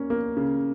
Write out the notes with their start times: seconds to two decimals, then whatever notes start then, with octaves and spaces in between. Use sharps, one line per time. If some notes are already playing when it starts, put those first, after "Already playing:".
Already playing: A#3 C#4
0.10 A#3
0.37 C#3